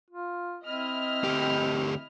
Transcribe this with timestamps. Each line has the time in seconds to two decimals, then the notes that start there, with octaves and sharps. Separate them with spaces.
0.10 F4
0.65 C4 E4 D#5 F6
1.24 D2 G4